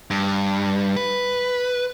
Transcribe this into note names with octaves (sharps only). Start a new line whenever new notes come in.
G2
B4